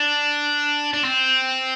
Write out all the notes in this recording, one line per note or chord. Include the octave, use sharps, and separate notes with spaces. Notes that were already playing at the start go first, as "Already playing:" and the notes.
Already playing: D4
D4
C4